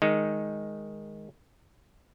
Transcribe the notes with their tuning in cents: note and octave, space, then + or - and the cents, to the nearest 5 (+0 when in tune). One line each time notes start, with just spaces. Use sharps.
D#3 +0 G#3 +0 D#4 +0